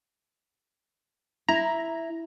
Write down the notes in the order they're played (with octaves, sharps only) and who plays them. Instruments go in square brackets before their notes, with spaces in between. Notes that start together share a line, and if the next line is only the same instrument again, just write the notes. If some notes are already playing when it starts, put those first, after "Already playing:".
[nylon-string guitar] E4 [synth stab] A#5